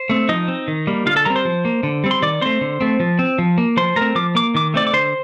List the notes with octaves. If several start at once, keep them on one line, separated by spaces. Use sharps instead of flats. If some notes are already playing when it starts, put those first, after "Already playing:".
Already playing: C5
A3 C4
F3 D#4 D#5
C4
D#3
G3 A#3
D3 F4 F5
A4 A5
G3 C4 A#4 A#5
C5 C6
F3
A#3
D3
G3 C4
C6
D#3 D5 D6
A3 C4 C5 C6
D3
A3 C4
F3
C4
F3
A#3
F3 C5 C6
A3 C4 A#4 A#5
F3 D6
A#3 D6
D#3 D6
A3 C4 D5 D6
D6
D3 C5 C6